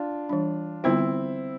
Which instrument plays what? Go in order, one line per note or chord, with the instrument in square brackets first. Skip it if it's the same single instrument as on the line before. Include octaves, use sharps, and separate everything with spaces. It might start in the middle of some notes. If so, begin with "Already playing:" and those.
Already playing: [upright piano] D4 F4
[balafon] E3 G3 D4
[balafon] D3 G3 B3 F4 C5 [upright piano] C4 E4